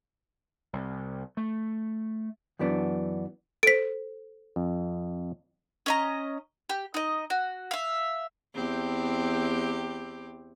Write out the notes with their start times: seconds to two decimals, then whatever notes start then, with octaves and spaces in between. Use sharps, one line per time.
0.73 C2
1.37 A3
2.59 F#2 E3 B3 D4
3.63 A4 C5 B6 D7
4.56 F2
5.86 C#4 D#5 A#5
6.69 G4
6.94 D#4 D#5
7.30 F#4
7.71 E5 F5
8.54 E2 C4 G4